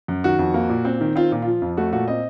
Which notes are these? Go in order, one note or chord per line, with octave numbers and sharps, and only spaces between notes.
F#2
D#3 F#4
F2
A#3
A#2
C4
D#3
C4 F4
A#2
F4
F3
F2
A3 F#4
A#2 F#4
C4 D#5